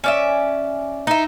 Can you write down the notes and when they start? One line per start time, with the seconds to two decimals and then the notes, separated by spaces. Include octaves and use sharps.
0.04 C#4 D5 E5
1.07 D#4 E4